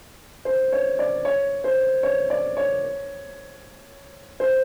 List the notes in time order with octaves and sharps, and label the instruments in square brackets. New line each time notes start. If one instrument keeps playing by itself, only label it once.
[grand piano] C5
C#5
D5
C#5
C5
C#5
D5
C#5
C5